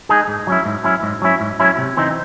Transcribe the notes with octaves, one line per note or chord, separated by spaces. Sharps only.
G#3 D#4 G#4
G#2
F#3 C#4 E4
G#2
F#3 C#4 E4
G#2
F#3 C#4 E4
G#2
F#3 C#4 E4
C3
E3 C4 D#4